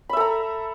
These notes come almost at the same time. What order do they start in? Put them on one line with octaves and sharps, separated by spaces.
B5 E5 A4 A#5